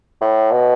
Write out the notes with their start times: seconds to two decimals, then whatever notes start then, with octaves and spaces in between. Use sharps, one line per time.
0.21 A2
0.52 B2